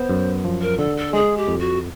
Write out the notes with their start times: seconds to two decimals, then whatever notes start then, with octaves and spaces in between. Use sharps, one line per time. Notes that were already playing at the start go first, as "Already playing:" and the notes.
Already playing: B3 C5
0.10 F#2
0.45 F3
0.61 A#4
0.78 D3 A4
0.97 A4
1.13 G#3 G#4
1.37 G4
1.48 F2
1.59 F#4